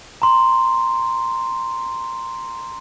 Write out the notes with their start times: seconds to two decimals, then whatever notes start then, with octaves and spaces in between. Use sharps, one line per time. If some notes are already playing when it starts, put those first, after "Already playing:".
0.22 A#5 C6